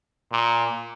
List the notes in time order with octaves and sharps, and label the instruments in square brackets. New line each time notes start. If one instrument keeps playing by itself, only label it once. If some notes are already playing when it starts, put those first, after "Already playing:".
[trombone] A#2